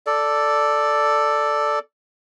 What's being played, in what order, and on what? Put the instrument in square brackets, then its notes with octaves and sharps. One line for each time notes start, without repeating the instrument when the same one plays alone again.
[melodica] A4 D5